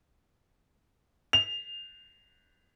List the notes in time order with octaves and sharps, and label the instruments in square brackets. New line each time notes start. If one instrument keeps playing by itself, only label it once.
[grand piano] F7